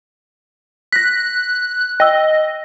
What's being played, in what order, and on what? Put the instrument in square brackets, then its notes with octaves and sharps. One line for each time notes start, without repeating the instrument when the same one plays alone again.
[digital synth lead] F#6 [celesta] A#6 B6
[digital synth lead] D#5 [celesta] G5 E6